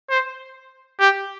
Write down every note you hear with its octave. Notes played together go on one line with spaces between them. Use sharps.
C5
G4